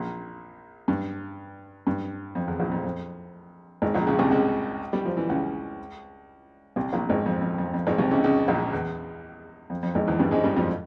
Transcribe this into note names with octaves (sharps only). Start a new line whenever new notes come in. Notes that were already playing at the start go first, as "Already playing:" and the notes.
Already playing: A#1 A#2
G2
G2
F2
E2
A#1 A#2
F2
F2
G#1 G#2
A#1 A#2
C#2 C#3
C2 C3
C#2 C#3
G3
F3
E3
C#2 C#3
C2 C3
A#1 A#2
G#1 G#2
F2
F2
F2
F2
G#1 G#2
C2 C3
C#2 C#3
C#2 C#3
A#1 A#2
E2
F2
F2
G#1 G#2
E2 E3
G2 G3
G#2 G#3
G2 G3
F2 F3